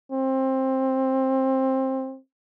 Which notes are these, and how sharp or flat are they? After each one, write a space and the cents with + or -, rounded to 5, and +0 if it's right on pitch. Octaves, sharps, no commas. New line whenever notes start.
C4 +15